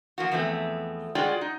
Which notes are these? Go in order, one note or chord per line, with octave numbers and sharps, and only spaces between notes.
F3 A#3 F#4
E2 F3 A3 B3 C4
G#3 F4 F#4 G#4 D5 G5
D#4